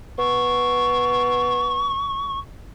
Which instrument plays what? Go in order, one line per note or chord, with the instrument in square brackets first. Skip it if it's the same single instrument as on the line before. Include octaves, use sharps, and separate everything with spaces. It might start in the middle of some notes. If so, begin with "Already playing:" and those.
[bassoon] B3 [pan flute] C#6